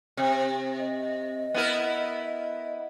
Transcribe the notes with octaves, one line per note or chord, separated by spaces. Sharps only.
C3
D#5
B3 E4 A#4